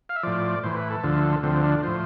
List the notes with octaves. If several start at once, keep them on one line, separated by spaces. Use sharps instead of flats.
F5
E5
A2 F3 D5
A2 E3 C5
B4
A4
D2 D3 F3
D2 D3 F3 C4
D4
A2 F3 C5